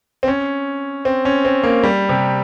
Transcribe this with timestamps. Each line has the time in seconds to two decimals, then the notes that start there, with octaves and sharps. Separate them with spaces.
0.23 C4
0.28 C#4
1.05 C4
1.25 C#4
1.45 C4
1.64 A#3
1.83 G3
2.09 C3